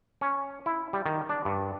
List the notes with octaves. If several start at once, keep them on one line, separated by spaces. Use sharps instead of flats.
C#4
E4
G3
D#3
D4
G2